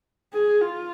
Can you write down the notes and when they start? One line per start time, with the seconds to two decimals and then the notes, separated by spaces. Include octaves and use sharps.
0.33 G#4
0.61 F4